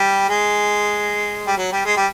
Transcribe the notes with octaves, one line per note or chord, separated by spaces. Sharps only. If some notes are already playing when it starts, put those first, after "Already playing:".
Already playing: G3
G#3
G3
F#3
G3
G#3
G3